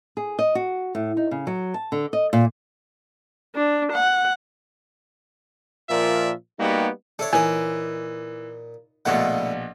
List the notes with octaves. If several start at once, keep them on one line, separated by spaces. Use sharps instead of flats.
G#4
D#5
F#4
A2
D#4
C#3
F#3
A5
D3
D#5
A#2
D4
F#5
A#2 F3 F4 A#4 D5 E5
G3 A#3 B3 D#4 F#4 G4
D4 E4 A4 C#5
A#2 E3 D#4 C#5 D#5 G#5
A#1 B2 D3 A3 E4 F#5